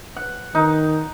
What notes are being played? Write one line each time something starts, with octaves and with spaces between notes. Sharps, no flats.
F#5
D#3 D#4